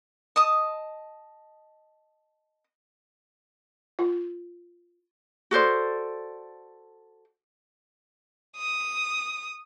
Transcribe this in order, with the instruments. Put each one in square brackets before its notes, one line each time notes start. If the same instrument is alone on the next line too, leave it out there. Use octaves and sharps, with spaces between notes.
[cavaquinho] D#5 A5 D#6
[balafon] F4
[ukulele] F#4 A4 C5 D5
[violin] D#6